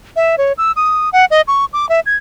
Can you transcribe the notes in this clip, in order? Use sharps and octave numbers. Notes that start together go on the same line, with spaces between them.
E5
C#5
E6
D#6
F#5
D#5
C#6
D6
E5
G#6